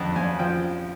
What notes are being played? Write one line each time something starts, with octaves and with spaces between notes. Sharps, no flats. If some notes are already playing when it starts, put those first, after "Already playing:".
Already playing: F2 D3 F#5
F2 G#5
F3 G5